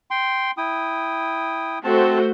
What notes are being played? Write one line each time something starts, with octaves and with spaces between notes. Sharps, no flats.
G5 C6
E4 G5 D#6
A3 C4 F#4 C5 A5